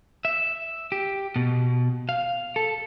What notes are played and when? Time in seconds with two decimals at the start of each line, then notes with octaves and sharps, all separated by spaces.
0.25 E5
0.92 G4
1.36 B2
2.09 F5
2.56 A4